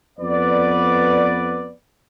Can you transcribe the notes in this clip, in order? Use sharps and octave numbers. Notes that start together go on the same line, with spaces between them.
F2 B3 B4 D5